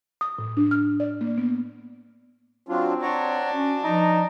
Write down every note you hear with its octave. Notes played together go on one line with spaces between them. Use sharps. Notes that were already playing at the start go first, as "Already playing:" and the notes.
D#6
A2
D4
F6
D5
A#3
B3
F#3 C4 D4 F4
D4 C#5 F#5 A#5
C#4 F#4
F3 D#4 A#5